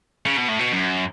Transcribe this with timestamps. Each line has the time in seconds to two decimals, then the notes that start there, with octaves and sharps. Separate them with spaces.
0.26 C#3
0.37 B2
0.49 A2
0.60 B2
0.73 F#2